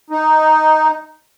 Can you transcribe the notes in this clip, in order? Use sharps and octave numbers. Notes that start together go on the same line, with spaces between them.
D#4